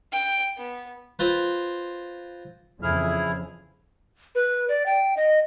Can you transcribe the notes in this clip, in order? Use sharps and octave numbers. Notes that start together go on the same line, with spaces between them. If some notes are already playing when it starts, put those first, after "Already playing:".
G5
B3
C4 F4 B4
F2 C#3 E3 E4 G#4 F6
B4
D5
G5
D#5